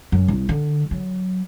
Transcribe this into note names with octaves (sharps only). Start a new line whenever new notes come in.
F#2
C2
D3
F#3